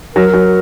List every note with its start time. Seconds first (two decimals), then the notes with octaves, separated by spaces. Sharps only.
0.15 F#3 A#4
0.33 F#3